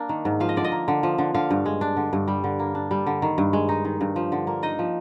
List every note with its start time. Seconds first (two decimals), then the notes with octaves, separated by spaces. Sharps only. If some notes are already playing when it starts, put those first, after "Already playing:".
Already playing: A#3 D4
0.09 D#3
0.25 G#2
0.40 F3 F5
0.49 D#5
0.56 D3 D5
0.64 D#5
0.72 A#3
0.88 D3
1.03 F3
1.18 D3
1.34 D3 F5
1.51 G2
1.66 G#3
1.81 D4
1.97 D3
2.13 G2
2.28 G3
2.44 D3
2.59 A#3
2.75 D4
2.91 G3
3.06 D3
3.22 D#3
3.38 G2
3.53 G#3
3.69 D#4
3.85 D#3
4.01 G2
4.16 F3
4.32 D3
4.47 A#3
4.63 D#4 D#5
4.79 F3